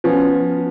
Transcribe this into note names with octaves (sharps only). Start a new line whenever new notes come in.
F3 B3 C#4